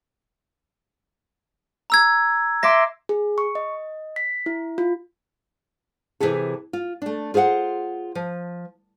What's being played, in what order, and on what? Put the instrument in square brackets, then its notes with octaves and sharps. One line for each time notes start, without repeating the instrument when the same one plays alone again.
[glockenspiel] A#5 E6 G#6
[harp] E5 C6 D6 [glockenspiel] A#6
[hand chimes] G#4
C#6
D#5
B6
E4
F4
[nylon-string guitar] C3 E3 E4 G#4 A4
F4
A3 D4
F4 G#4 C5 F5 F#5
F3